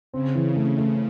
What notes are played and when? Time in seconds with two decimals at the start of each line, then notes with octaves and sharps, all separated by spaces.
0.13 C#3 C4
0.35 E3
0.56 A3
0.78 A3